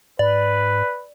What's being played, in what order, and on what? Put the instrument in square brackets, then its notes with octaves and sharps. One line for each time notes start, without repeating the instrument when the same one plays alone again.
[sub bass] G#2 [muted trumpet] B4 [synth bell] D5